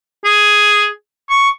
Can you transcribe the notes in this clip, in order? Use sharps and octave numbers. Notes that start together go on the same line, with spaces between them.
G#4
C#6